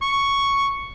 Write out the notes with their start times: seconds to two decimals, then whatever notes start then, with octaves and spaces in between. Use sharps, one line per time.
0.02 C#6